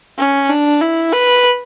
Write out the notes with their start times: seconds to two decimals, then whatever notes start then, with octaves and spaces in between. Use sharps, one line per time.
0.18 C#4
0.50 D4
0.81 E4
1.13 B4